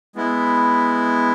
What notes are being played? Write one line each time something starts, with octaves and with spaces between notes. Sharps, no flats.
G#3 B3 E4